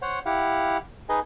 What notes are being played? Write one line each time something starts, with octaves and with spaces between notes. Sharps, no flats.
C5 C#5 F#5
E4 G4 F5 F#5
D#4 G#4 B4 D#5 G#5